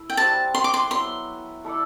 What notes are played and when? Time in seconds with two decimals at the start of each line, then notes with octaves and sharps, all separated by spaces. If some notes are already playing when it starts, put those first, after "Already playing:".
Already playing: A3 E4 E5
0.10 G5
0.17 G3 C4 F#4 B4 A5
0.55 C6
0.64 D6
0.74 C6
0.91 F#3 B3 E4 B4 C6
1.64 A3 E4 A4 D5